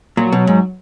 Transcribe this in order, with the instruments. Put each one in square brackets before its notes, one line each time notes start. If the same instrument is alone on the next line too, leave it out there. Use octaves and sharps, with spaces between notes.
[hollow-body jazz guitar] A#2 [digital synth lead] F#3
[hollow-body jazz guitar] B2
G#2